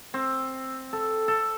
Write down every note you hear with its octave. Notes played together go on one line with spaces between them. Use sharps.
C4
A4
A4